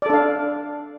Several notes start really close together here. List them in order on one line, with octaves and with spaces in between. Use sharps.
D5 A4 D4 F5